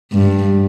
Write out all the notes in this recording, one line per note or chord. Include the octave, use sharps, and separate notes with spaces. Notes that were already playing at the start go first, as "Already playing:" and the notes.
G2